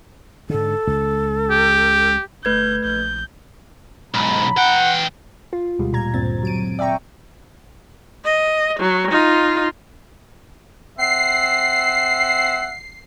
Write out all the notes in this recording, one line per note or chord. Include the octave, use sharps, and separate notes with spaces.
G#2 D3 A4
C#2
G4
G1 A3 B4 G6 G#6
A#1 G6
B1 G#2 A#5 B5
E3 F#5 G5
F4
D2 B2 G3 G#3
A#2 G3 A#5 G#6
D2 G2 A#2 C4 A6
F#3 D7 D#7
D5 E5 G5 A#5 C#6
D#5
F#3
D#4 F4
C4 E5 F#5 C7